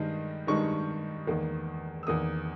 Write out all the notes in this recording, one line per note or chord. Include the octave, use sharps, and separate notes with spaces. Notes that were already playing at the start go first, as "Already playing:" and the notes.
Already playing: G2 D#3 G#3 D#4
G2 D#3 G#3 D#4 C#6
E2 D#3 A#3
E6
E2 D#3 A#3 D#6